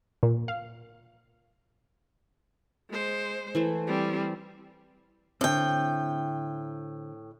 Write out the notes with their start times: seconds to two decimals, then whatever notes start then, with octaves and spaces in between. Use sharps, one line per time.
0.23 A#2
0.48 F5
2.90 G#3 C5
3.55 E3 A3 C5
3.87 G3 C4
5.41 A2 D3 C4 G5